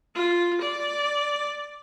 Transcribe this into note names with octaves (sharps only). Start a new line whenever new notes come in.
F4
D5